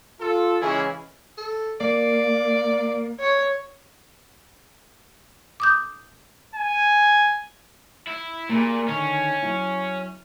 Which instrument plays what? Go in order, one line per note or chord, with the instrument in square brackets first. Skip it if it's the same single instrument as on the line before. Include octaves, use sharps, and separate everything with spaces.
[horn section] F4 A4
C#3 E3 G#3 C#4 E4 G#4
[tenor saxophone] A4
[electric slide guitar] A#3 [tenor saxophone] D5
[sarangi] C#5
[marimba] D6 D#6 G6
[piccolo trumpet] G#5
[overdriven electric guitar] E4
[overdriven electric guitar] A#2 [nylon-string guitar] A#3 G4 G#4
[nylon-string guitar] D3 D#3 [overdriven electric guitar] C#4
[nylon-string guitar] F#3 E4